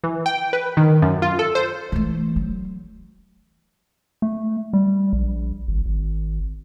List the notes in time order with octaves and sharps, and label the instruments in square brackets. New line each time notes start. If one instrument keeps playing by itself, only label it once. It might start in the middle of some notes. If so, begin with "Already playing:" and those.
[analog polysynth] E3
G5
B4
D#3
F#2
F4
A4
C5
[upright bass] E3 A3
F#3
[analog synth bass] A3
G3
A#1
G#1
G#1